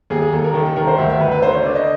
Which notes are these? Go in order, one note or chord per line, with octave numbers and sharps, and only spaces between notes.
D#2 G#4
G#4
D#2 A4
A#4
D#3 A4
A4
D#3 A#4
C5
D2 E5
E5
D2 B4
B4
D3 C5
C#5
D3 D5
D#5